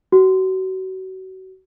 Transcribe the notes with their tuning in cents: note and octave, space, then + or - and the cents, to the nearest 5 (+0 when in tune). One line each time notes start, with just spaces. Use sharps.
F#4 +30